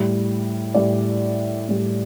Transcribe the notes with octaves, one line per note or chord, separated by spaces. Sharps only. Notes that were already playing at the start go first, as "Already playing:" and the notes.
Already playing: A2 G3
A2 G3 D5
A2 G3